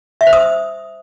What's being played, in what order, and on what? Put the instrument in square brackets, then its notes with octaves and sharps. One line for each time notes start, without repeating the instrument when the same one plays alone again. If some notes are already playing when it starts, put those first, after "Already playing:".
[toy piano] E5
C5
D#6